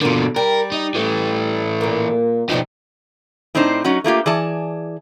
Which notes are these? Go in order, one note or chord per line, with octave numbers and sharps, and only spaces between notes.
B2 D3 A#3 F4
G3 A#4
D#4
E3 A3
A#2 A#3
G2 B2 F3 G3 D#4
A2 C4 D4 D#4 C5
F#3 C#4 D#4 F#4
A3 A#3 F4 G4
E3 G#4 D5 A5